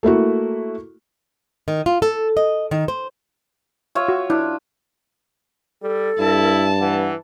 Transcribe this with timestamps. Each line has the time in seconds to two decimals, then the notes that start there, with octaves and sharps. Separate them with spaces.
0.03 A3 A#3 E4 F#4
1.68 D#3
1.86 F4
2.02 A4
2.37 D#5
2.71 D#3
2.88 C5
3.95 F4 C#5 E5
4.08 F#4
4.30 D4 E4
5.83 G3 A4
6.19 G2 E4 A5
6.80 E3 F#5